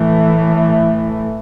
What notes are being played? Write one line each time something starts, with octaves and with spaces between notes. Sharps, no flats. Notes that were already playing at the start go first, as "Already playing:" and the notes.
Already playing: A2 E3 A3